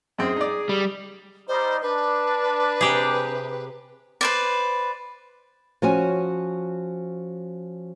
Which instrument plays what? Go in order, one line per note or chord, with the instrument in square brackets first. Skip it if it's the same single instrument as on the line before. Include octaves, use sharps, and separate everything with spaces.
[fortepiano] F#2 C4 [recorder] G#4
[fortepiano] D#4 D5
[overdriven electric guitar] G3
[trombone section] G3 D#4 [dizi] C5
[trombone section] D4 [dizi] B4
[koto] C3 G4 G#4
[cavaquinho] B4 C5 D5
[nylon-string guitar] F3 C#4 F#4 C#5 G#5